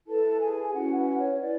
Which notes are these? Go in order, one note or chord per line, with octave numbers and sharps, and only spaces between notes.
E4 A4 B4 A5
G#4 G#5
G#5
C#4 E4 F#4 B4 F#5
F#4 F#5
C#5
E4 B4 D5